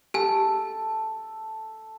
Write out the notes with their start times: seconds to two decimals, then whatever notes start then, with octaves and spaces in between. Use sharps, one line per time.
0.14 G4 A4 G#5